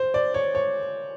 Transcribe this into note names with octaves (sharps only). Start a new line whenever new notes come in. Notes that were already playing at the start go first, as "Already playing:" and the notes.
Already playing: C5
D5
C#5
C#5